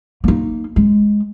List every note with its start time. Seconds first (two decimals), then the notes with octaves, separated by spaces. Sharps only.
0.24 A#3 D#4
0.76 G#3